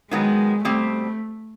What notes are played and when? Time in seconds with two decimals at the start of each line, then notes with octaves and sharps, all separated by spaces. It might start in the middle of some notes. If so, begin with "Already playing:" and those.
0.11 D#3 F#3 G#3 B3
0.64 B2 G3 A3 C4